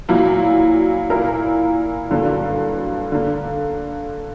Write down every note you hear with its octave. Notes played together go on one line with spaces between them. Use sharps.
A#2 F#3 A#3 E4
A#2 A#3 E4 A#4
G2 D3 F#3 A#3
D3 A#3 D4